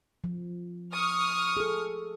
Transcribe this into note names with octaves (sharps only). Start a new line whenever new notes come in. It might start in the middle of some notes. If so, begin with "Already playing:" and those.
F3
C#6 D#6 F6
G#4 A4